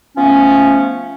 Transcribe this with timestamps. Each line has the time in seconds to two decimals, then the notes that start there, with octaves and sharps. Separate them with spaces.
0.17 F3 A3 B3 C#4